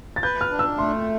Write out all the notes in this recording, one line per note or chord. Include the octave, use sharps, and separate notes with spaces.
A6
B4 G6
F6
D4
E6
A3 C6